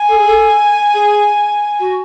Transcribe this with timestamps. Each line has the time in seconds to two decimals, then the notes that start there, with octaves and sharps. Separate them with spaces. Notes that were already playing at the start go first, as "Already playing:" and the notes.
Already playing: G#5
0.08 A4
0.18 G#4
0.27 A4
0.94 G#4
1.80 F#4